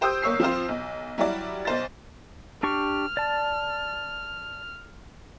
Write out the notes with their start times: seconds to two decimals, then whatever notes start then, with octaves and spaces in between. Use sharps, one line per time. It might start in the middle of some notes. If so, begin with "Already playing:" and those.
0.01 G4 C5 G5 D#6 E6 G6
0.22 G1 A#3 C#5 E6 C7
0.40 F3 C4 F4 C5
0.68 B1
1.18 F#3 G3 E4 F#4 D5
1.65 B1 C5 A6
2.63 D4 G4 C#6 F6
3.17 D5 A5